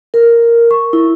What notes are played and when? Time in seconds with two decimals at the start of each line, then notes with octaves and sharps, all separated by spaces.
0.14 A#4
0.71 C#6
0.93 E4